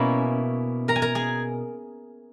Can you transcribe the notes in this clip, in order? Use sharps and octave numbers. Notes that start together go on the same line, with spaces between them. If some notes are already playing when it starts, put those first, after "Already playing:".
Already playing: B2 A#3 C#4 E4 E5
A#4 A#5
G#5
A#4 A#5
G#4 G#5